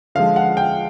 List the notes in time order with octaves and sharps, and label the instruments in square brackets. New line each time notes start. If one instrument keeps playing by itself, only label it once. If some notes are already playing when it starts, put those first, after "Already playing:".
[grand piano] D3 F3 G#3 F5
F#5
G5